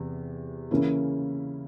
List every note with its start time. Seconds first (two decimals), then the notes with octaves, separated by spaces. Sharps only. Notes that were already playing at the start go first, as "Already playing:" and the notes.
Already playing: E2 C3
0.71 C#3 E3 A#3 C#4 E4